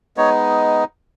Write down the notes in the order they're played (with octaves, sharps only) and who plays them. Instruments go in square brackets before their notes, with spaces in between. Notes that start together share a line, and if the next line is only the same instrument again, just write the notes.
[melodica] G#3 B3 D#4 C#5